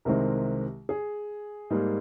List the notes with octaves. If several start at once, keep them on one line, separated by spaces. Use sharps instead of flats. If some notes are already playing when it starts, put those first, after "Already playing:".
C2 C3 D#3 G#3 C4 A#4
G#4
G#2 G3 A#3